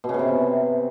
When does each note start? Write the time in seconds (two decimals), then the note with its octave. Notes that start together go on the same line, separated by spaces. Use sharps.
0.04 B2
0.09 C#3
0.14 B2
0.19 C3